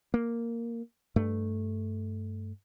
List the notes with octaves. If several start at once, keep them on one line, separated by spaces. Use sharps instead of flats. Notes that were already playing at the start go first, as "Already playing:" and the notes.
A#3
G2 A3